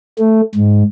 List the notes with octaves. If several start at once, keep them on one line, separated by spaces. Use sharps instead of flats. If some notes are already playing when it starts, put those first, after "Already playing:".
A3
G#2